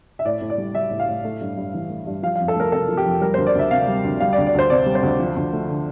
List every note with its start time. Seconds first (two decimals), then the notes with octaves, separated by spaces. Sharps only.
0.19 E5
0.25 A2 D5
0.41 A2
0.50 D5
0.58 G3
0.74 G3 E5
0.90 A2
1.00 F5
1.08 A2
1.25 A3
1.41 G2
1.57 G2
1.74 E3
1.90 A3
2.07 G2
2.23 F3 F5
2.36 F2 F5
2.48 A4
2.56 A3 A#4
2.72 C3 A4
2.88 F3
2.97 G4
3.06 F2
3.21 G3 A#4
3.34 D2 C5
3.47 D5
3.55 D2 E5
3.71 C3 F5
3.88 G3
4.04 D2
4.20 G3 F5
4.33 D5
4.38 D2
4.47 D5
4.54 D2 C5
4.70 C3 D5
4.86 G3
4.95 C5
5.03 D2
5.19 F3
5.36 D2
5.53 A3
5.69 D3